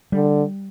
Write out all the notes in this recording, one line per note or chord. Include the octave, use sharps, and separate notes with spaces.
D3 G3